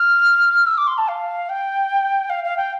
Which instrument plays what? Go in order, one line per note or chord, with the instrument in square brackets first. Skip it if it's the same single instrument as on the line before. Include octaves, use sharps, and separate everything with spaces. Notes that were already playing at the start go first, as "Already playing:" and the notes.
Already playing: [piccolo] F6
E6
D6
C6
A5
F5
G5
F5
F5
G5